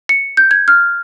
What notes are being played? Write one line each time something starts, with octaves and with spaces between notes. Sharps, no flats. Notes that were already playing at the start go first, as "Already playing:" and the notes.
C#7
G6
G#6
F6